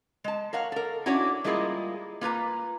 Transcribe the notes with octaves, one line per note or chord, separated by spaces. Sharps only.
G#3 A5
A#4 C#5 F5 F#5
A4 A#4
C#4 D4 E4 F#4 C#5 D5
G3 G#3 A#3 E4 F4 G#4
A#3 F4 B4 A#5